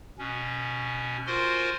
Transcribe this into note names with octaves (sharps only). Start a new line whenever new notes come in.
B2 C#4
F4 F#4 A#4 C5 G#5 C6